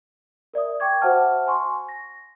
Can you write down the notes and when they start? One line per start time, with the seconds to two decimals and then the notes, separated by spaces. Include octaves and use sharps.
0.54 A#4 D5 E5 D#6
0.80 G5 C#6 D6 G#6
1.02 F#4 C5 E5 F#5 A5 F6
1.47 G#5 C6 C#6
1.89 A#6